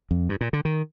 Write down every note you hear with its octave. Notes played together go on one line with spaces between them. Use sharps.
F2
G2
A#2
D3
D#3